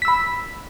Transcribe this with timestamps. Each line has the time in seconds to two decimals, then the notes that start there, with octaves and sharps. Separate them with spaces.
0.02 B6
0.05 E6
0.08 B5